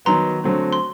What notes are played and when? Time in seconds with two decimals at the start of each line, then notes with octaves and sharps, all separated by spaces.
0.05 D#3 F#3 B3 A#5 C6
0.44 D3 F#3 A3 C4
0.73 C6